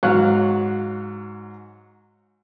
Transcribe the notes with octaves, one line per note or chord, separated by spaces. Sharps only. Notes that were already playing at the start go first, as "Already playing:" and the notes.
G#2 F#3 C#5 F5 F#6